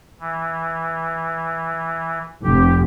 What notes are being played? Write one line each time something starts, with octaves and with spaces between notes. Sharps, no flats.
E3
F1 G4